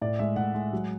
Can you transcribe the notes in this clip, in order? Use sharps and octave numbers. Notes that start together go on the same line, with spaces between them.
A2 D5
G#3 E5
A2 F#5
G#3
F#3